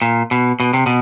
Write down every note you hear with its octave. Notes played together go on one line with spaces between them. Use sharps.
A#2
B2
B2
C3
B2